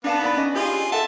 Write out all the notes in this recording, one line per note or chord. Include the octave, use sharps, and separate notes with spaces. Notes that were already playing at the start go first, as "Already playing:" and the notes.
B3 D4 F5 A5
D#4 D5 B5
C#4 D4 D#5
E4 F4 G4 G#4 C#5 D#5
A4 E5 F#5 A5